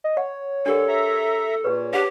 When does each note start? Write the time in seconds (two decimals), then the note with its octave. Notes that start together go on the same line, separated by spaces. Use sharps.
0.04 D#5
0.17 C#5 F#5
0.66 D3 D4 G4 A4 A#4
0.88 E5 A#5
1.64 A#2 G#4 B4 C#5
1.93 D4 G4 F#5